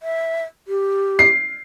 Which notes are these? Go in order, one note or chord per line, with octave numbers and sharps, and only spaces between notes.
E5
G4
C7